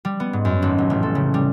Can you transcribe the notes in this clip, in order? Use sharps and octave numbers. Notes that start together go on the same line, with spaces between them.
G3
B3
G#2
F#2
G#1
F1
A1
A4
C#3
G3